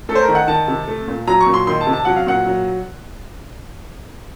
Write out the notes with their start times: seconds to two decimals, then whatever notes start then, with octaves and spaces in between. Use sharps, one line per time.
0.09 A3 A4
0.15 C5
0.21 A#4
0.28 D#3
0.35 F#5
0.48 D#3 A5
0.68 C3
0.88 A3
1.08 A#2
1.27 F#3 A#5
1.40 C#6
1.47 A#2
1.54 C6
1.67 D#3 C6
1.81 A5
1.87 C3
1.93 A5
2.05 F#3 F#5
2.16 F5
2.27 A#2 F#5
2.47 F#3